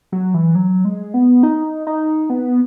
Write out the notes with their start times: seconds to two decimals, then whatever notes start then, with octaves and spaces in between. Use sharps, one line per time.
0.12 F#3
0.34 E3
0.55 F#3
0.85 G#3
1.14 B3
1.43 D#4
1.87 D#4
2.30 B3